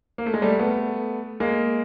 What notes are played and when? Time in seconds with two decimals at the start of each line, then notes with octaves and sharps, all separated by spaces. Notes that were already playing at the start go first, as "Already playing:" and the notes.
0.18 A#3
0.26 A3
0.34 G#3
0.42 G3 A3
0.59 A3 B3
1.40 G#3 A#3